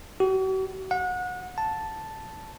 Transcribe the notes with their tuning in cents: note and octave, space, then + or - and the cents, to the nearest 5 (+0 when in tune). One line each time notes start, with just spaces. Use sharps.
F#4 +45
F#5 -30
A5 +0